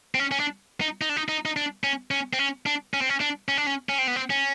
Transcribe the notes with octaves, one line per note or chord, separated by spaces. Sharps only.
C4
C#4
C#4
D4
D#4
D#4
D4
D#4
D#4
D#4
D4
C#4
C#4
C4
C#4
D4
C#4
C4
C#4
D4
C#4
D4
C#4
C#4
C4
B3
C4
C#4